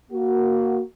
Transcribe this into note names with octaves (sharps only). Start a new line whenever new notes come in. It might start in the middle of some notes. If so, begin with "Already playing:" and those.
A#3 F#4